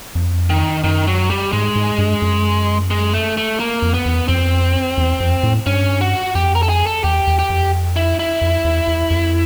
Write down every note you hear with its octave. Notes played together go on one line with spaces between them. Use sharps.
F2
D#3
F#2 D#3
F#3
G3
G#2 G#3
G#2
G2
F#2
G#3
A3
A3
A#3
F2
B3
E2
F2 C4
E2
F2
A2
G2 C#4
F#4
F2 G4
A#4
A4
G#4
A4
E2 G4
E2
G4
F2
E4
E4
F2
E2
E2
F2